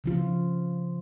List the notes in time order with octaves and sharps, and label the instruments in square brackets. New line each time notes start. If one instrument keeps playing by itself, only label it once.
[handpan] C#3 F3 F4